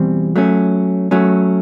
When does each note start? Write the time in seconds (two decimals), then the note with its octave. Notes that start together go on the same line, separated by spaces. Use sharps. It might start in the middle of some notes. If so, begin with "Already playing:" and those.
Already playing: E2 B2 G3 C4
0.36 F#3 A3 C#4
1.11 F#3 A3 C#4